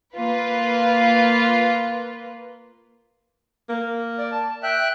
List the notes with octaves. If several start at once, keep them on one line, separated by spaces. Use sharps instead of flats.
A#3 F4 B4
A#3
D5
A5
E5 G5 F#6